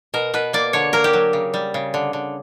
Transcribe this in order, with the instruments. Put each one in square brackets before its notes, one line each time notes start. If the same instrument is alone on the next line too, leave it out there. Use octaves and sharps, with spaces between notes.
[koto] B2 A#4
B2 B4
A#3 D5
D3 C#5
A#3 A#4
G4
F#3
C#3
G3
C#3
D3
D3